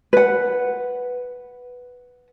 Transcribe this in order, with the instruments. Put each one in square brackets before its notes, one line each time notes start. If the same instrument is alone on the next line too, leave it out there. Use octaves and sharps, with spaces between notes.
[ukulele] B4 F#5